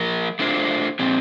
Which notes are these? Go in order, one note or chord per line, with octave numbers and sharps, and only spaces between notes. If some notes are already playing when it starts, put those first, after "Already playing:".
Already playing: F3 A#3 F4 A#4
A3 D4 F4 C5
A#2 F3 C4